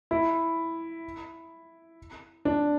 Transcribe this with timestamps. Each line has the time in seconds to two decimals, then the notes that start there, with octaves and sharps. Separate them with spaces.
0.11 E4
2.45 D4